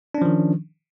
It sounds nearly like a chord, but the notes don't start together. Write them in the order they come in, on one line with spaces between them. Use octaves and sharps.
D4 C#4 F3 D#3